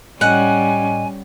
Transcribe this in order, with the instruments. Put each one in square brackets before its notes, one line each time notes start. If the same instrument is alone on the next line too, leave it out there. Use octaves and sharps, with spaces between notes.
[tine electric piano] A2 D#5 [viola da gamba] G3 C#4 [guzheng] F#5 [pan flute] G#5